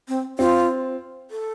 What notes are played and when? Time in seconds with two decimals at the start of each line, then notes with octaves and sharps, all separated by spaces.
0.08 C4
0.39 C4 F4
1.31 A4